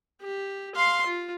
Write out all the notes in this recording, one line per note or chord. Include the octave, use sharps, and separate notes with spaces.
G4
F5 C6
F4